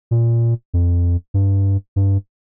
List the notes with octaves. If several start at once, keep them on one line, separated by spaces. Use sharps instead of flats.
A#2
F2
G2
G2